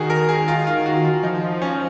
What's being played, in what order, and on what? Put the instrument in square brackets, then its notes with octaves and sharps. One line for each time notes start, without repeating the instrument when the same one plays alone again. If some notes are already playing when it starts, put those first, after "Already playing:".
Already playing: [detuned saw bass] D#3 [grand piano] F#4 G#4
[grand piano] A#4
G#4
F4
F4
F#4
F4
[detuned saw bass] F3 [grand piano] D#4
[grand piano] C#4